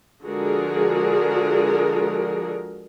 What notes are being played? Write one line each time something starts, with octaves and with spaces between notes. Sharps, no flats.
D3 F3 G#3 F#4 G#4 A#4